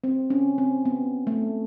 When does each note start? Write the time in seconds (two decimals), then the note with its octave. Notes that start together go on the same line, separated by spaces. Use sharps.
0.04 C4
0.30 C#4
0.58 C4
0.85 B3
1.27 A3